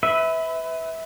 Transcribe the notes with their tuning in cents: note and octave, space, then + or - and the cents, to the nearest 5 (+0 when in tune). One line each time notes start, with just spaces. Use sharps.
B4 +20 E5 -20